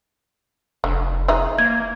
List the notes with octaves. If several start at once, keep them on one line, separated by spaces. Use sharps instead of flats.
F1 D3
E3 G#3 D#4 E5
A#3 G#6